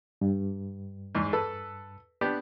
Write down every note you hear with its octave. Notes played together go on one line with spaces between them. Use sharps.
G2
E2 G#2
A4 B4
B3 D4 G4